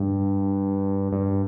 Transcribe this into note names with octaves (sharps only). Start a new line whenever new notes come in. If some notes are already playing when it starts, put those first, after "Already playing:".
Already playing: G2
G2